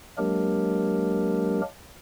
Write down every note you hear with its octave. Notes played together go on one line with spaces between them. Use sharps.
F#3 G#3 A#3 D4 G4 A#4